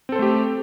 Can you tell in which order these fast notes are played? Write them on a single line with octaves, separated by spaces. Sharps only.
C4 A4 C5 A3 G4